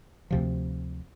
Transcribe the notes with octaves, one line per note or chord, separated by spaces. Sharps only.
D2 C3 F3